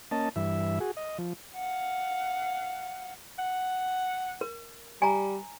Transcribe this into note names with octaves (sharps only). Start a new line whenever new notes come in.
A#3 C#4 D#5 A5
G2 E3 E5
F#4 G#4
D#5
F3
F5 F#5
F#5
A#4
G3 G#5 A#5